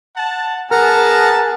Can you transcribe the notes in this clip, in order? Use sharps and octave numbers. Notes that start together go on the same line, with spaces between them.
F#5 A5
B3 G#4 A#4 F#5 A5 A#5 F6